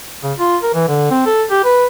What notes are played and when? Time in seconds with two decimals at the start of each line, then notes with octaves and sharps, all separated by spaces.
0.23 C#3
0.39 F4
0.63 A#4
0.74 E3
0.88 D3
1.11 C4
1.26 A4
1.51 G4
1.64 B4